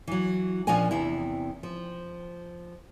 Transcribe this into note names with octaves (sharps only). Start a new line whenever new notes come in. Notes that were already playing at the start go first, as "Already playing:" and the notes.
E3 F#3
A#2 F3 C#4 D4 D#5 G#5
E2 C3 E4
F3